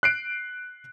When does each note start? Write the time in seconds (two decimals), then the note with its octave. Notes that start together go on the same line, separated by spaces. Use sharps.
0.03 F#6 C7 D7